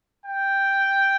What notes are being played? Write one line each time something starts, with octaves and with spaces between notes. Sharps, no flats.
G5